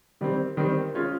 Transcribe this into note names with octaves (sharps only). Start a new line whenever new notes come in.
D#3 G3 C4
D#3 G3 C4
G#3 C#4 F4